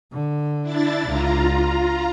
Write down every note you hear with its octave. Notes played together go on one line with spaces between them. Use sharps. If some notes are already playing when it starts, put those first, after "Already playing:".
D3
D4 E4 A6
C#2 F4 A#5